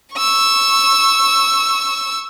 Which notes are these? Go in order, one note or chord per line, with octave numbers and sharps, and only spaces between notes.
C#6 E6